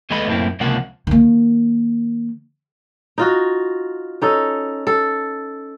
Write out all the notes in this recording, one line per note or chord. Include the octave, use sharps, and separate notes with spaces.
D#2 G#3 A3 B3 D#5 B5
F#2 A2 A#3 C4 E4
C#2 C3 F3 A#3 F#5
D#3 A#3
D#4 F4 F#4
C#4 D#4 A4
A4